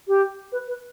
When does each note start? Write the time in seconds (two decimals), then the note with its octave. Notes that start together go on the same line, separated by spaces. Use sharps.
0.08 G4
0.52 B4
0.68 B4